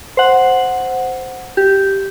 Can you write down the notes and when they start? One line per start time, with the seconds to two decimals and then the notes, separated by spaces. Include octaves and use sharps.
0.17 C5 F#5
1.57 G4